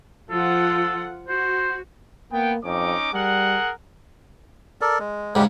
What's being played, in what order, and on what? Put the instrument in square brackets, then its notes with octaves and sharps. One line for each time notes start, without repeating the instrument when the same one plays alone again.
[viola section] F3 F4 F#5 [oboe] A4
[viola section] F#4 [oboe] C5
[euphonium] A#3 [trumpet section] B3 G5
[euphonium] F2 [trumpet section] C#4 D#4 D6
[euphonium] G3 [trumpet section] G#4 A#4 F#5
[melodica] A4 A#4 D5
G#3
[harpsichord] G#2 C#3 [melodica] G3 G#3 G4